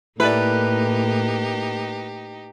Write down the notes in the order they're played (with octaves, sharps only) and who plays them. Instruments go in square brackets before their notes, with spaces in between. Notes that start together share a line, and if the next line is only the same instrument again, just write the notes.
[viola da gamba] A2 A#3 [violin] D#4 G4 [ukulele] E4 A4 D5 [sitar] B4